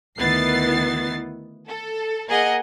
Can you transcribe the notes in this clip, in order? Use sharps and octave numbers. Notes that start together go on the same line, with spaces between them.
D2 D#3 B3 E4 A6 C7
A4
A#3 G#4 A#4 D#5 F#5